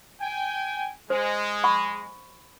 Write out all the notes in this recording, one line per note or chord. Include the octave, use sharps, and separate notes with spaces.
G5 G#5
G#3 C5
F#5 B5 C#6